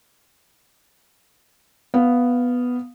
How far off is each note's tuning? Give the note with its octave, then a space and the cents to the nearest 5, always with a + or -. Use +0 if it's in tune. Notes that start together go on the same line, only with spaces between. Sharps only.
B3 +0 F5 +0